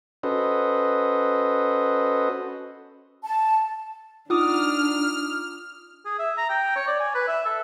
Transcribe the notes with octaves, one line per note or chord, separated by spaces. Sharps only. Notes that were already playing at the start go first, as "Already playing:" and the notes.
C#4 F#4 A4 B4 C5 D#5
A5
D4 D#4 F4 D6 D#6 F6
G#4
E5
A#5
G5
C#5
D5
G#5
B4
E5
A4